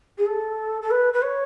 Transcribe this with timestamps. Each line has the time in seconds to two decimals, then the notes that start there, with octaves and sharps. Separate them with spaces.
0.17 G#4
0.26 A4
0.81 A4
0.90 B4
1.13 B4
1.22 C#5